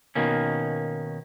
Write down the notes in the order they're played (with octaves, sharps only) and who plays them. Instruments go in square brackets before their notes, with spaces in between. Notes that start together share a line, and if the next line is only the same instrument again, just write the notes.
[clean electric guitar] B2 D#3 A#3 C#4